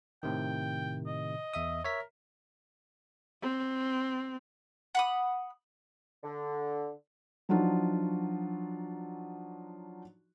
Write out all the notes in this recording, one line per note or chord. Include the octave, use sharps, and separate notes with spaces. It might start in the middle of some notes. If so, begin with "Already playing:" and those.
A2 C3 D#3 G5
D#5
E2 E5 D#6
A#4 C#5 E5 B6
C4
F#5 B5 D#6
D3
F3 F#3 D4 D#4 F4 F#4